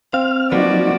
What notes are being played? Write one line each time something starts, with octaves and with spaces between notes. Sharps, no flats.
C4 F5 F6
F3 F#3 A#3 B3 D#4 F#4 D5